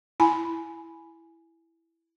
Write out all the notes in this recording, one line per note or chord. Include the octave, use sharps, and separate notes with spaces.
E4 G#5 B5